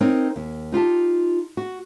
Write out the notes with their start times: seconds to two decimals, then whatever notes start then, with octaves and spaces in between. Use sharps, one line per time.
0.01 C4 D#4 A#4 C#5
0.36 D#2
0.72 D#4 F4 G4 A5
1.57 F#4